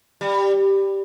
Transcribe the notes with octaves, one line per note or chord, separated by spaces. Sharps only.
G3